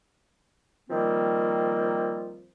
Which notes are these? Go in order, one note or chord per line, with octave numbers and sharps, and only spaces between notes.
D#3 F3 G3 A#3 C4